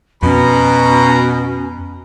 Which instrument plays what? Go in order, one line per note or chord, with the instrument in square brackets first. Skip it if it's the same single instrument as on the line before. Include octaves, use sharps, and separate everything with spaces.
[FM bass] F2 [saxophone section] B2 [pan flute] C#4 [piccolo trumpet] A#5